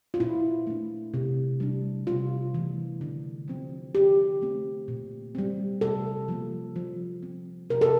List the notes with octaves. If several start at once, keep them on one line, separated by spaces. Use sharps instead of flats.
F4
A#2 E4
A3 D4
C3
G3 D4
C3 F4
E3 A3
D3
F3 C4
D3 G4
A3 C4
A#2
G3 C4
C3 A4
F3 A#3
F3
C4
C3 A#4
A4